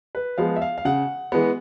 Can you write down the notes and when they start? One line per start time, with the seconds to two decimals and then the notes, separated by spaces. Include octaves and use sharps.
0.15 B4
0.38 F3 G#3 B3 F5
0.56 E5
0.62 F5
0.78 F5
0.85 C#3 F#5
1.32 E3 G#3 B3